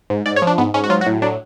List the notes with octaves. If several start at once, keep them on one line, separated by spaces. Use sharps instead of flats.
G#2
G#2 D5
C#5
F3
D4
G#2 B3
G#2 C#4
F#4
F#3 F4
F#4
A2
F#3 D4